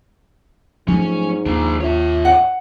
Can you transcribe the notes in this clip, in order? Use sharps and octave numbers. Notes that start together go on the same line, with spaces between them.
G#2 F3 F#3 A3 C#4
D#2 D4 F4
D#2 F4 C#5 E5
F#5